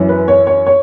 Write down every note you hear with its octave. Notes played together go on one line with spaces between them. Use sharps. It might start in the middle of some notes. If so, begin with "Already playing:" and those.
Already playing: F#2 E3
B4
C#5
C#5
C#5